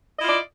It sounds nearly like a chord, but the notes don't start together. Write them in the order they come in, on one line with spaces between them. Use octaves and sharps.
D#5 E4 F4 D5